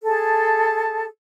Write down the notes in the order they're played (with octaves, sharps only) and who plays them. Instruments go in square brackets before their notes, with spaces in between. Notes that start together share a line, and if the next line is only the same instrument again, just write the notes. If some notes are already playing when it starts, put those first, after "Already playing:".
[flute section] G#4 A4 A5